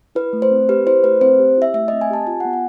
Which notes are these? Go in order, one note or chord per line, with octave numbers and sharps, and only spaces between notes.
E4 B4
A3
C5
C4
G4 B4
E4 C5
A3 B4
C4 C5
G4
E4 E5
A3 E5
C4 D#5
G#5
G4 A5
F4 G#5
F#5
B3
F#5